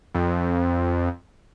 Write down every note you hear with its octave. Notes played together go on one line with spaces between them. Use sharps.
F2